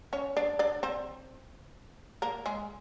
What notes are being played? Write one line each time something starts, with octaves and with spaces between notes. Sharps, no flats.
C#4 C#5
D4 D5
D4 D5
C4 C5
A#3 A#4
G#3 G#4